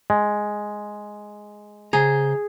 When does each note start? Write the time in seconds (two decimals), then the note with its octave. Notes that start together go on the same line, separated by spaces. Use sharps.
0.10 G#3
1.93 C#3 G#4 C5 A#5